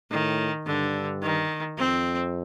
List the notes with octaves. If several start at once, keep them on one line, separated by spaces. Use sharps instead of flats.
A2 D#3
G2 D3
D#3
F2 C4